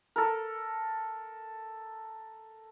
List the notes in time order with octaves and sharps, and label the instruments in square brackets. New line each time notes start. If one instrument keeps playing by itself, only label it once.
[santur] A4 A#4